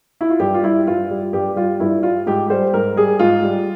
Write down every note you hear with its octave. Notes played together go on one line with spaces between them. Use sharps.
E4
F4
G2 G4
F4
G3 E4
G2 F4
G3
G2 G4
G3 F4
G2 E4
G3 F4
G#2 G4
G3 C5
G#2 A#4
G3 G#4
G#2 F4
G3